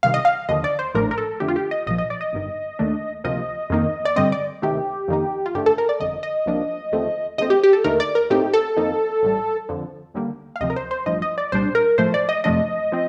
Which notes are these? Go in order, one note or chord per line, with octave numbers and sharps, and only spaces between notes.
C2 C3 D#3 F5
D#5
F5
D#2 D3 F3 D#5
D5
C5
A1 A2 F3 A3 D4 A#4
A#4
A4
F2 D3 A3 D4 G4
F4
G4
D#5
A#1 A#2 F3 D#5
D#5
D5
D#5
G1 G2 D#3
D#2 D#3 A3 D4
D2 C3 F3 A#3 D#5
F2 D#3 A#3 D#4
D5
G2 D3 G3 C4 D#5
D5
D2 C3 D#3 A3 G4
F2 D#3 A#3 D#4
F4
G2 D3 A3 G4
A4
A#4
D5
G1 F2 D3 D#5
D#5
C2 C3 F3 A#3 D4
D#2 D3 F3 A3 C4
A#1 A#2 A3 C4 D#5
G4
G4
A4
D#2 D3 A3 D#4 A#4
D5
A#4
A2 A3 C4 D#4 G4
A4
F2 D#3 A#3 D#4
A1 A2 G3
F2 D3 F3
D#2 D3 G3 A#3
F5
D2 C3 F3 D#5
A#4
C5
C5
A1 G2 F3 D#5
D#5
D5
C2 A#2 G3 D4 C5
A#4
A2 F3 A3 C5
D5
D#5
F2 C3 F3 A3 D4 D#5
F3 C4